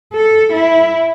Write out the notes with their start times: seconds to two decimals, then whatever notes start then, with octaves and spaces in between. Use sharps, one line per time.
0.13 A4
0.52 E4